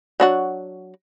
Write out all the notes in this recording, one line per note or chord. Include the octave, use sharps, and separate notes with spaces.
F#3 D4 F#4